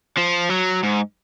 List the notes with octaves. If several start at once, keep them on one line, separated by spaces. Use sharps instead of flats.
F3
F#3
G#2